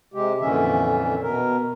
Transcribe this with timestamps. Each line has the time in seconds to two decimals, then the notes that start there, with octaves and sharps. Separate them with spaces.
0.14 C3 G#3 G4
0.41 F2 A#2 D3 E3 C#4 E5
1.23 B2 A#4